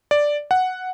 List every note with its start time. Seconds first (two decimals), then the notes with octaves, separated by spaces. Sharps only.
0.11 D5
0.51 F#5